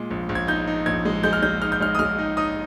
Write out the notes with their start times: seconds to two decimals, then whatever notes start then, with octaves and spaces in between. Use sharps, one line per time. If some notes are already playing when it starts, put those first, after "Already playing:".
Already playing: A#2 G#3
0.11 A#1
0.29 A#1
0.35 G#6
0.47 D#4 G6
0.67 D#4
0.86 A#1 G#6
1.05 G#3
1.23 G#3 G6
1.33 F6
1.43 G#3 G6
1.62 D#4 F6
1.72 G6
1.81 G#3 F6
1.95 D#6
1.99 G#3 F6
2.19 D#4
2.37 D#4 D#6